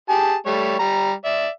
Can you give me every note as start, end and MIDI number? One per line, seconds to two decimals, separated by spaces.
0.09 0.35 67
0.09 0.35 68
0.09 0.35 81
0.46 0.75 55
0.46 0.75 57
0.46 0.75 73
0.79 1.12 55
0.79 1.12 82
1.25 1.48 74
1.25 1.48 76